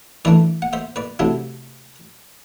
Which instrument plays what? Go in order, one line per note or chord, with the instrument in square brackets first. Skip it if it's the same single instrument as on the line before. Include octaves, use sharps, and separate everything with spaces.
[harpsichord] E3 A3 D4 B4 D5
F#5
C5 E5
B4 D5
C3 F#3 A3 D4 E4